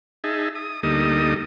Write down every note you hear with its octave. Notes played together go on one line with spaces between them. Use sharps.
D#4 G#4 E5 A5
D#6
D2 G3 A#3 D#4 A4 D#6